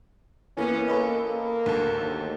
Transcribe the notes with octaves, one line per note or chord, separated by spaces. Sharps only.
E3 A#3 B3 C#4
A#3 A4 B4 D#5
A#3
D2 A4
D#2